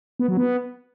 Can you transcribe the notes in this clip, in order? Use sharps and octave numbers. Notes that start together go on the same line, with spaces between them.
B3
F#3
B3